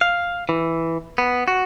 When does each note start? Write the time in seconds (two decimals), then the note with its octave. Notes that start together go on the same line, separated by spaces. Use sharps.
0.01 F5
0.49 E3
1.18 B3
1.48 F#4